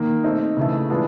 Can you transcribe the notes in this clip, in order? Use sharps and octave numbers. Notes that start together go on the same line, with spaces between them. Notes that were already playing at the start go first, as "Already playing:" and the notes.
Already playing: D#3 A#3
A3 C4 D#4
C#3 E3 A3
E3 G#3 B3 D4 F4